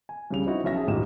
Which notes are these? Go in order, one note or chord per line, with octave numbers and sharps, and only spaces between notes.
G#5
C2 C#3 G3 F7
C4 D#4 E4 F#4
B1 C#4 E5 A#6
G#4 E5 A5
D1 G#1 A#2 D#4 G4 E7